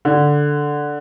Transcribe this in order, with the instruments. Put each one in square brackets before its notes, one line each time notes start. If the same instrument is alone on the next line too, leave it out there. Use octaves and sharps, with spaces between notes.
[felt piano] D3